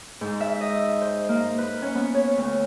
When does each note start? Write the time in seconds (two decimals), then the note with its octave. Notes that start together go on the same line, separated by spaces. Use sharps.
0.21 G#2
0.40 E5
0.61 D#5
1.01 C5
1.29 A#3
1.58 B4
1.82 C#4
1.95 B3
2.14 C#5
2.37 D2